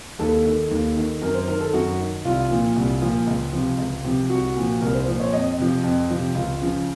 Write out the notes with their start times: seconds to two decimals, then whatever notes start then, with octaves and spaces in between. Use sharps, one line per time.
0.19 D#2 A4
0.45 D#3
0.71 D#2
0.96 D#3
1.22 F#2 A#4
1.34 C5
1.47 D#3 A#4
1.61 A4
1.73 F#2 F#4
2.00 D#3
2.25 C2 F4
2.51 A#2 F3
2.76 C2
3.02 A#2 F3
3.27 C#2
3.52 C3 F3
3.78 C#2
4.04 C3 F3
4.30 C2 F#4
4.56 A#2 F3
4.81 C2 A#4
4.94 C5
5.06 A#2 F3 C5
5.20 C#5
5.33 F2 D#5
5.58 C3 F3
5.84 F2
6.10 C3 F3
6.35 C#2 F4
6.62 C#3 F3